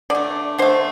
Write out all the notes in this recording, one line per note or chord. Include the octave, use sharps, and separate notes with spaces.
D3 A3 D5
D3 A3 C5